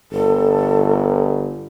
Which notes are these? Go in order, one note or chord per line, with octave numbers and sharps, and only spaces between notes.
G1 A4